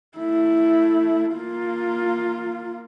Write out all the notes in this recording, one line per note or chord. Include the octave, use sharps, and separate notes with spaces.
A3 E4
A#3 F4